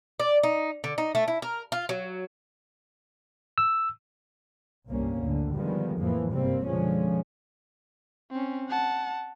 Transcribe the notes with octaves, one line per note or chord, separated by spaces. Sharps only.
D5
D#4
D3
D#4
A3
E4
A#4
F4
F#3
E6
G1 C2 G2 C3 A#3 C#4
D2 A2 D3
D3 D#3 F3 G3 G#3 B3
F2 A2 E3 F3 A#3
F#1 G2 C3 G3 A#3 C4
B2 D3 F3 G#3 C#4
C4 C#4
F#5 A5